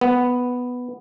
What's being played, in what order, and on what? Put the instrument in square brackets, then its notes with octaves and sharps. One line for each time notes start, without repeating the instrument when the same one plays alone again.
[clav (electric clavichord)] B3